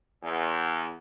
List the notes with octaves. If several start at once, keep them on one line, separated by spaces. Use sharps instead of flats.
E2